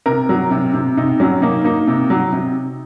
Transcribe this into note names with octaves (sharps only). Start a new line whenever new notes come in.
C3 A#4
F#3
C3
C3
C3 D#4
F#3 C#4
A#3 D#4
A#3 D#4
C3
F#3
C3